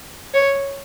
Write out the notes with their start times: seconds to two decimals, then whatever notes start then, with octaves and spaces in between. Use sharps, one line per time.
0.34 C#5